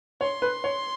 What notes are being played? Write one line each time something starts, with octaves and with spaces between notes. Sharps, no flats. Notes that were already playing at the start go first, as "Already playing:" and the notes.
C#5 C6
B4
C#5